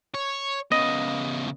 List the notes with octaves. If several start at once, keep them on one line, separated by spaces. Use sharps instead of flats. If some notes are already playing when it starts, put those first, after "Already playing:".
C#5
C#3 B3 D#5